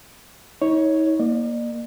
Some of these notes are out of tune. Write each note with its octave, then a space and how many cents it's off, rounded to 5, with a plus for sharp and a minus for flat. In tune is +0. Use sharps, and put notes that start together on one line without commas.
D#4 +40 C#5 +0
A#3 +15 D5 +45